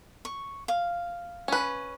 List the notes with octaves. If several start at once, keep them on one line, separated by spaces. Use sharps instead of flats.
C#6
F5
C#4 B4